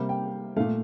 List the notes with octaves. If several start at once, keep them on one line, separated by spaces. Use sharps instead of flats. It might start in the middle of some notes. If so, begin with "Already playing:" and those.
Already playing: C3 G3 A#3 F5
G5
A#2 A3 F5